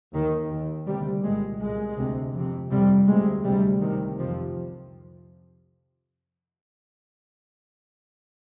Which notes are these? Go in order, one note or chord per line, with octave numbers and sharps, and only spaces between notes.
D#2 D#3
D#2
D2 C3 G3
C2 A#2 G#3
C2 A#2 G#3
D2 C3
F2 C3
F2 C3 G3
D2 C3 G#3
D2 C3 G3
C2 C3 D#3
F2 C3 F3